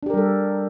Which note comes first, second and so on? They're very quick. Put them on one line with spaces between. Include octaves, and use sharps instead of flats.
D4 G4 A#4 G3 A4